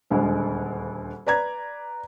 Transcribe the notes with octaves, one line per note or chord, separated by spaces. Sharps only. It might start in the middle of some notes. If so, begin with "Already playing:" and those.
D#1 D2 G#3
B4 D5 A#5 G#6